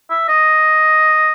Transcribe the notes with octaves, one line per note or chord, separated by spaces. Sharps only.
E5
D#5